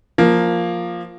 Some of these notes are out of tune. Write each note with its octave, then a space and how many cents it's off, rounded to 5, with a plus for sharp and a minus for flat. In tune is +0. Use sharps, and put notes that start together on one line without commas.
F3 +0 A#3 +0